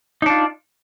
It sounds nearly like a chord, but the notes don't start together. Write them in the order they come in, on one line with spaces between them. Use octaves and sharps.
D#4 D4 F4